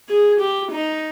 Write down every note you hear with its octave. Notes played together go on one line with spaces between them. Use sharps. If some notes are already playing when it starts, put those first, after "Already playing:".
G#4
G4
D#4